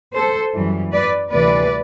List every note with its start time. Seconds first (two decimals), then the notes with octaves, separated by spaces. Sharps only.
0.15 A4 C5
0.53 F#2 E3 G3
0.92 B4 D5
1.31 D2 C3 E3 G3 B4 D5